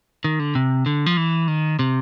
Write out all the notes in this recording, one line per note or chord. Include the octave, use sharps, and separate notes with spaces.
D#3
D3
C3
D3
F3
E3
D#3
C3